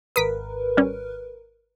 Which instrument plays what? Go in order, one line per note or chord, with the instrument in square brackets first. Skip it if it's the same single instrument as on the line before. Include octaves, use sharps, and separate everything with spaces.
[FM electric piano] G#1 A#4 B4 [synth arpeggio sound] D#6 B6 D7
[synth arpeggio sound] G3 C#4